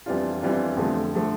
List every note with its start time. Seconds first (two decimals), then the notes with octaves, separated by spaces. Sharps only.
0.06 F2 E3 G3 D4 F4
0.41 F2 E3 G3 D4 F4
0.77 F2 D3 F3 A3
1.14 D3 F3 A3